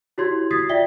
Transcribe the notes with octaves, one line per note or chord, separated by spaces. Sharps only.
E4 F#4 G4 C#5 C6 G#6
D#6 G#6 A6 B6 C7
F4 D5 E5 G5 B6 G7